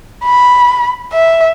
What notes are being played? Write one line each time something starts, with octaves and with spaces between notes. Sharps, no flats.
B5
E5